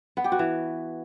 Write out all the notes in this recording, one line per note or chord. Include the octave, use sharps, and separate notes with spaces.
B3
G4
F#4
E3